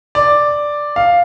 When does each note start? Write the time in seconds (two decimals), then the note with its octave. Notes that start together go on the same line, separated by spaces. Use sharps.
0.15 D5
0.96 F5